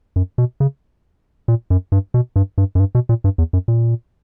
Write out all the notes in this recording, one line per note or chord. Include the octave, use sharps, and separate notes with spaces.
F#2
B2
C#3
A#2
F#2
G2
B2
G2
G2
F#2
G2
B2
A#2
G2
E2
F#2
A#2